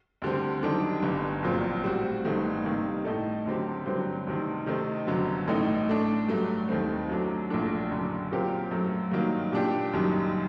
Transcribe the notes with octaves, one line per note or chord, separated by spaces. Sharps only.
D2 D3 G3 C4
F#2 D#3 G3 D4 A4
G1 G2 D3
A#1 A#2 F#3 C4
A2 G3 C4 F#4
G1 G2 D#3 A3
C3 D#3 G3 A#3
A2 A3 D#4 A4
D2 D3 F#3 C4 G4
G2 D3 F#3 C4
D2 C3 D#3
C3 D#3 A3 C4 D#4
G1 F#2 D3 F#3
A1 A2 A3 D#4
A2 A3 D4
G2 F#3 A3
D#2 D#3 A3 C4
F#2 F#3 A3 D4
A#1 A#2 A3 D4 A4
F#1 F#2 D3
A#2 F#3 C4 G4 A#4
F#2 F#3 A3
G2 D#3 F#3 A#3
A#2 G3 D4 G4
F#1 F#2 D#3 G3